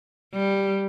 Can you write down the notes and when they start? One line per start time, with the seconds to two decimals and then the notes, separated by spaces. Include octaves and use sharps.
0.34 G3